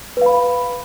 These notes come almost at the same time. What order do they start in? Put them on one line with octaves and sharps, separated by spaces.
B4 F5 B5